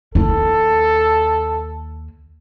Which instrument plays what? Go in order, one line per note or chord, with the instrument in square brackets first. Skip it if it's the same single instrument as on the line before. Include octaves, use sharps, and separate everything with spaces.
[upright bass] D#2 E4 [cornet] A4